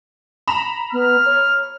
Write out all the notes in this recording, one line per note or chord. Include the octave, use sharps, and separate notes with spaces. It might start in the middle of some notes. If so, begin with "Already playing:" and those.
A#5 B5 E7
B3 F6
C#5